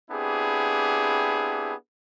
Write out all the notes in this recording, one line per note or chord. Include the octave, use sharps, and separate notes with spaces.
B3 C4 D4 E4 G4 G#4